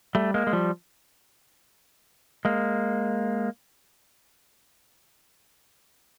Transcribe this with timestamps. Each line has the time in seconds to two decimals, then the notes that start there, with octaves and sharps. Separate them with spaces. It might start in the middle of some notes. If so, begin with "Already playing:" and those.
0.15 G3 A3
0.34 G#3 A#3
0.47 G#3
0.53 F3 G3
2.45 G#3 A#3